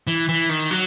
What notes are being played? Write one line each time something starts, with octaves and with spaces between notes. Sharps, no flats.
E3
E3
D#3
F#3